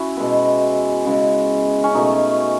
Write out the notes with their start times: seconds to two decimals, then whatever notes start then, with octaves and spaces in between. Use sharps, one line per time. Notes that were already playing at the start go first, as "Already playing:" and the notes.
Already playing: C#4 E4 F#4
0.17 B2 G#3 B3
1.06 C#3 G#3 B3
1.84 C#4
1.94 B2 A3 D#4